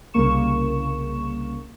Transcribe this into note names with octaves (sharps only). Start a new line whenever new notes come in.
C2 C#3 A#3 C#6 E7